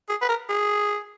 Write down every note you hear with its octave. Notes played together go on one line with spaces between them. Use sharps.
G#4
B4
A#4
G#4